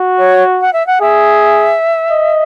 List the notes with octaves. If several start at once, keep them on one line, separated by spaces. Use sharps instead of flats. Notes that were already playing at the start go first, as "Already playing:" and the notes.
Already playing: F#4
C#5
F#5
E5
F#5
G#4 E5
D#5